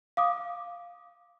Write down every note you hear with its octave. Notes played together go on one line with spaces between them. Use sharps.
F5 D6 D#6